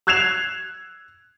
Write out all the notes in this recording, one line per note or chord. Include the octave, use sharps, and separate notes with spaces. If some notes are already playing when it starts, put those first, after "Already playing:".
E6 F#6 G#6 C7 E7 F7